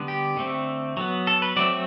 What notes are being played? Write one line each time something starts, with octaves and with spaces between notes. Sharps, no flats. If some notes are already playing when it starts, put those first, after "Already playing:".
Already playing: D3 G3 B3
G4
D3 A3 C4
F#3 B3
A4
B4
F#3 A3 C4 D5